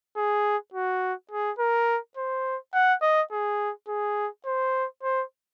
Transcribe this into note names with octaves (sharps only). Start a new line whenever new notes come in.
G#4
F#4
G#4
A#4
C5
F#5
D#5
G#4
G#4
C5
C5